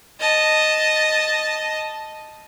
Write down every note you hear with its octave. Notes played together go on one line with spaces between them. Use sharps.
D#5 A5